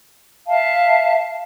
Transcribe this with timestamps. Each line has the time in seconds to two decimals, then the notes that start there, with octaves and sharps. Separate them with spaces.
0.47 E5 F5 A5